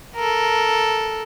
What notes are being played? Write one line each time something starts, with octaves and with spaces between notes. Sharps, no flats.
A4 A#4